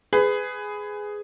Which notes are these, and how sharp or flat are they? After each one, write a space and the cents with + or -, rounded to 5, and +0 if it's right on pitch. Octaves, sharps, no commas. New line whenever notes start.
G#4 +0 B4 +20